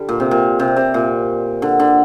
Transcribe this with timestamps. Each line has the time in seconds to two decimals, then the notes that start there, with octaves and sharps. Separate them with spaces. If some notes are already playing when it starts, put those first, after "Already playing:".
Already playing: D3 G3
0.09 A#2
0.20 C3
0.31 A#2
0.59 C3
0.77 C3
0.94 A#2
1.62 D3
1.79 D3